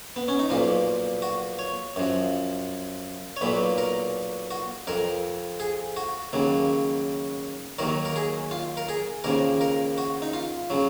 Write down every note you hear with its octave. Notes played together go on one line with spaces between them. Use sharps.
B3
C#4
D#4
B1 A#2 F3 F4
F#4
C#5
F#2 F3
C#5
B1 A#2 F#3 B4
A#4
F#4
F2 F3 A#4
G#4
F#4
D#2 C#3 F#3
D#2 D#3 F#3 A#4
A#4
G#4
F4
A#4
G#4
D#2 C#3 F3 A#4
A#4
F#4
D#4
F4
C#3 F#3